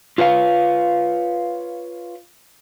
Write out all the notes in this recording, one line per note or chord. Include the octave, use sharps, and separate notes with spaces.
F4 B4 C#5 F5